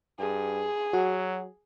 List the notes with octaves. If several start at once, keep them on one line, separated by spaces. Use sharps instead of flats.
G2 G#4
F#3 F#4